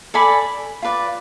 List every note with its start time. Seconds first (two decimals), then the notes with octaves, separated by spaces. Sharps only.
0.14 A4 D5 G#5 B5
0.82 F4 B4 D5